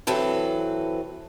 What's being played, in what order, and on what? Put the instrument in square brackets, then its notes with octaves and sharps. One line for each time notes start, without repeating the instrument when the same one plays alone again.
[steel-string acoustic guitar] E3 F#3 C4 A4 B4